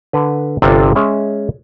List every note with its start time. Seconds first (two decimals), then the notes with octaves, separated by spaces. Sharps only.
0.13 D3 B4
0.62 G1 C3 C4 D4 F4 A4
0.95 G#3 C#4 E5